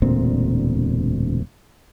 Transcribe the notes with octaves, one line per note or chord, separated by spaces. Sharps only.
E1 D2 A#2 C4